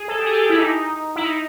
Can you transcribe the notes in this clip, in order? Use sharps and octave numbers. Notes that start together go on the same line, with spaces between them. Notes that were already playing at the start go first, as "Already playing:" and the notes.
Already playing: G#4
A4
G4
G#4
G4
E4
D#4
E4
D#4